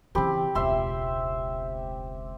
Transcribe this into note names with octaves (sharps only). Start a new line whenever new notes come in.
C#3 E3 C4 G4 B5
E1 C#2 C4 E5 C6